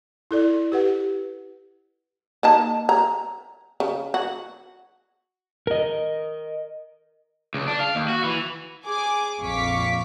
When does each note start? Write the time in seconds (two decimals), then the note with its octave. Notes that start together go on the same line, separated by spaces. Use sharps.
0.31 E4 A4 D5
0.72 G4 B4 F#5
2.43 A#3 D#4 A5
2.89 A#5
3.80 C#3
4.14 F#4
5.67 A#4 D#5
7.54 C#2
7.68 D4
7.80 F5
7.95 D#2
8.08 F#4
8.24 E3
8.86 G#4 G#5 D6
9.40 A#1 F2 F5 C#6 D6 B6